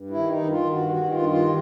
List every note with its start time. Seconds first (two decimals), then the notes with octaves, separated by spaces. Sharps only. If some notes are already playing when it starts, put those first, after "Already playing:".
Already playing: G2
0.10 E4
0.16 D#3
0.30 D#4
0.43 D#3
0.50 F4
0.69 G2 F#4
0.89 F#4
0.96 D#3
1.10 F4
1.23 G2
1.29 F4